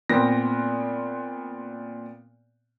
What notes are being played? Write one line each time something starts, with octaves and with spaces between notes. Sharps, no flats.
A#2 B3 C4 A#6